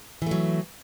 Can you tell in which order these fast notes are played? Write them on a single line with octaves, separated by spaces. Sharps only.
E3 A3 F#3